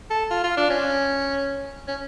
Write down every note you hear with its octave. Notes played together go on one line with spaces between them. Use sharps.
A4
F4
F4
D4
C#4
C#4